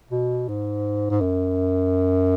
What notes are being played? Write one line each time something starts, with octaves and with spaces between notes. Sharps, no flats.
B2
G#2
G#2
F#2